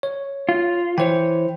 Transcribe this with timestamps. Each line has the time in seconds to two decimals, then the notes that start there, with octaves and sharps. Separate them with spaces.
0.03 C#5
0.49 F4
0.98 E3 C5 C#5 G5